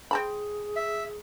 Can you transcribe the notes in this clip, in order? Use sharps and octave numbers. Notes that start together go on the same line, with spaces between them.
C4 G#4 A5 B5
E5